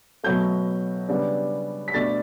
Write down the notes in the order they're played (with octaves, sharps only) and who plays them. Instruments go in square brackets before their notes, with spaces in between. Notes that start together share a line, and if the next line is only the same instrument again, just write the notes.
[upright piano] B2 F#3 A3 G6
C#3 G3 B3 D4
B6
B2 A3 D4 A6